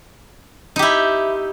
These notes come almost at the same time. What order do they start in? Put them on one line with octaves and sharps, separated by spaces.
D#4 G4 E4